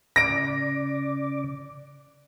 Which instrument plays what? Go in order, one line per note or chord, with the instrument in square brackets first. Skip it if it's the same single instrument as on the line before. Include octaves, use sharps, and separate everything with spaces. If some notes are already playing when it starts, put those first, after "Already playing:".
[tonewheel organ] C#3 D5 D6 [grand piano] A#6 D7